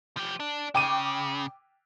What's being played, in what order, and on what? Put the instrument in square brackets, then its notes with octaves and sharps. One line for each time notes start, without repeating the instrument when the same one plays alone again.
[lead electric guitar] F3 G4
D4
[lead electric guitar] C#3 [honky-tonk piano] G5 D6 D#7